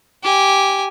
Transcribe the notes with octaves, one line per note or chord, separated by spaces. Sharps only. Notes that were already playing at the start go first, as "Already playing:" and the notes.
G4 G#5